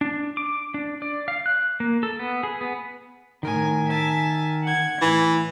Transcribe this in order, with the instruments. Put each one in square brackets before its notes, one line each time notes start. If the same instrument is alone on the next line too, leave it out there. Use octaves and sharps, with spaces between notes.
[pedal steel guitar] D4
D6
D4
D5
F5
F#6
A#3
A4
B3
G#4
B3
[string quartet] A2 G#5 [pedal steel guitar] D#3 A#4
[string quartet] E5 G#5 A5
F#5 G#6
[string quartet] A2 [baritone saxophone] E3